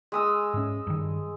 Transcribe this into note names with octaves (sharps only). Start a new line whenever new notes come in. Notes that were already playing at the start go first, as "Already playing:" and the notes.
G#3 D#6 E6
G#2 C#4
G2 D#3